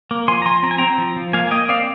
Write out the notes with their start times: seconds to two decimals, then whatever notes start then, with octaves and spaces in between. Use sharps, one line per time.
0.11 A#3
0.28 F3 G#5 C6
0.42 A#5
0.46 F3 G#5 C6
0.63 C4 A#5
0.71 G#5
0.78 C4 G5 A#5
0.98 F3
1.16 F3
1.33 A#3 F5 G#5
1.47 G#5
1.51 A#3 D#5 G5
1.69 C4 D5 F5